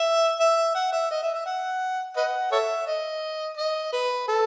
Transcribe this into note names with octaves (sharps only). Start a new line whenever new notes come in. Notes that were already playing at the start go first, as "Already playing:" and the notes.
Already playing: E5
E5
F#5
E5
D#5
E5
E5
F#5
B4 D#5 F#5
A4 C#5 E5
D#5
D#5
B4
A4